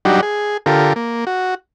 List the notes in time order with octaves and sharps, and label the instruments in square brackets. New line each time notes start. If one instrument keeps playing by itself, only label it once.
[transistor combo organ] F#3 G3 D4 D#4 F#4 G4
G#4
D3 F4 G4 A4 A#4
A#3
F#4